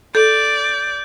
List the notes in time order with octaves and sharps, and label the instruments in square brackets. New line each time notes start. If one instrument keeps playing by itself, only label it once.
[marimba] A4 [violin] D5 [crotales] G6